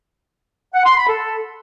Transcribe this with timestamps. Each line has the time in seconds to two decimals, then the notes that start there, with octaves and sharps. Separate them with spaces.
0.74 F#5
0.86 C6
0.97 B5
1.09 A4